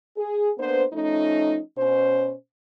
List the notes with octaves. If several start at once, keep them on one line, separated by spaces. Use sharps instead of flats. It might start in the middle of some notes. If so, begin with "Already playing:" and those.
G#4
A#3 B3 D4 B4 C5
F3 A3 C#4 D#4
B2 C#4 C5